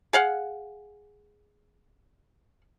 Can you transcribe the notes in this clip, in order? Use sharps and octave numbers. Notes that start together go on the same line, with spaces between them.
G#4 F5 F#5